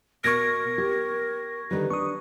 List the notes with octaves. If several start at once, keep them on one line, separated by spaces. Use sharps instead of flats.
B2 A#4 C#6 G#6 A#6
G4
D3 D#3 G3 B4
D4 C#6 D#6